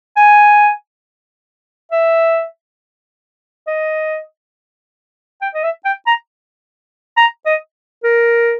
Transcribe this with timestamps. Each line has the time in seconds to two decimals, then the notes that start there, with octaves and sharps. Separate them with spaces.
0.17 G#5
1.92 E5
3.67 D#5
5.42 G5
5.55 D#5
5.63 E5
5.85 G5
6.07 A#5
7.17 A#5
7.46 D#5
8.04 A#4